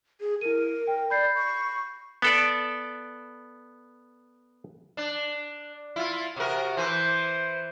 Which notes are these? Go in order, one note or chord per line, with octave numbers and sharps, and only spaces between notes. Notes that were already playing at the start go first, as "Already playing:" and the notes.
G#4
E4 A#4 D#7
G5
D5 B5 G6 C7
C#6
B3 A4 D5
D4
E4 F4
C3 F#4 A#4
E3 C5